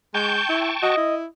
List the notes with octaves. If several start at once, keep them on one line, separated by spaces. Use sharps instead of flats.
G#3 G5 A5 C#6 G6
E4
F#4 D#5
E4